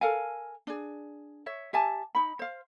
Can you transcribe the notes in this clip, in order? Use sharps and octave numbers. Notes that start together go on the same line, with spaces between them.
A4 A#4 F5 G#5
D4 G#4
C#5 E5
G4 E5 G#5 A5
D#4 B5
C5 F5